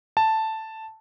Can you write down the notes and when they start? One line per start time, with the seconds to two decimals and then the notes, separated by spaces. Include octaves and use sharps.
0.17 A5